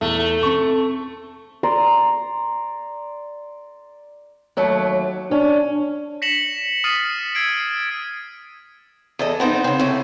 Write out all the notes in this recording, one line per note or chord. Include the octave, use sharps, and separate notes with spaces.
E2 A3
C4 C#6
D5 A#5 C6
D#2 F#3 A3
C#4 D4
A#6 B6 C#7 E7 F#7
D#6 F6 A6 B6 C7 D#7
E6 G#6 C7 D7
E2 A4 D#5
B3 C4 D4 D#4
C#3 C4
A2 C#4